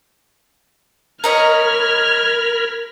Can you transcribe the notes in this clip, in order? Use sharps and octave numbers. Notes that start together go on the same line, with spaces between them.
A#4 C#5 D#5 A#5 B5 F6 G#6